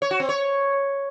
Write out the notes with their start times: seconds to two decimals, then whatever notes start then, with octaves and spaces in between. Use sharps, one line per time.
0.02 C#5
0.11 F#4
0.20 C4
0.29 C#5